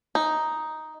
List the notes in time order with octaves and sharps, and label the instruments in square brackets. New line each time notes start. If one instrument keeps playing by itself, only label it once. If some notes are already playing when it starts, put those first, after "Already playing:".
[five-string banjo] D#4